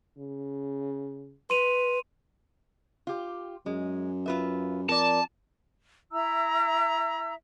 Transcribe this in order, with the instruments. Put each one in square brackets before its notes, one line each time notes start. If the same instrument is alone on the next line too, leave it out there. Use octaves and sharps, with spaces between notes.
[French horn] C#3
[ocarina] B4 [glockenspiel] C6 D#7 F7
[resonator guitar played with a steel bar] F4 G4
[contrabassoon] F#2 [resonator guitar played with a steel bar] G#3
[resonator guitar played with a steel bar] F4 B4 E5
[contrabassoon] F2 [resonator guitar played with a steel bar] A#4 D5 [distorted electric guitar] A5
[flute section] E4 E5 A#5 E6